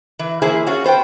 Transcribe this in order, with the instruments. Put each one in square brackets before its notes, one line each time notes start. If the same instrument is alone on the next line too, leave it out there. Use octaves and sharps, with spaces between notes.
[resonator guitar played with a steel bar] E3
E3 A#3 E4 G#4 C5
C#4 F4 F#4
B3 C5 F#5 G5